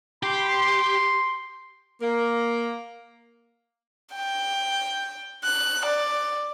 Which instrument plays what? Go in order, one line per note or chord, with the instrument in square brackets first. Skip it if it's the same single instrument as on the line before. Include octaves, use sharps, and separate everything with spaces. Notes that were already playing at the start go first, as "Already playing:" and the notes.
[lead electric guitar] G4 [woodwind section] B5 C6
[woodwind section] C6
[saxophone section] A#3 A#4
[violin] G5
F#6
D5